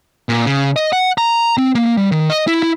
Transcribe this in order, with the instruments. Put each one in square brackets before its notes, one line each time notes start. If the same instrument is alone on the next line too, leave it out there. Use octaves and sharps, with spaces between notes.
[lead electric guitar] A#2
C#3
D#5
F#5
A#5
C4
A#3
G3
D#3
D#5
E4
E4